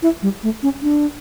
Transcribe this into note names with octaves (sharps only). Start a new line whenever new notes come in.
E4
G3
A3
C#4
D4